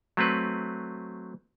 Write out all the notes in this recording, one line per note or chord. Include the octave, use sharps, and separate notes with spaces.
F#3 A3 C4 B4